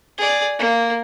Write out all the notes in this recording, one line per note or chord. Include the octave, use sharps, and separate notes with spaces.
G#4 D5
A#3